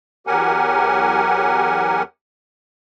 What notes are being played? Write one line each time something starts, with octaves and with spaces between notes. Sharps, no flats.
E2 F#3 G4 A#4 F#5 G#5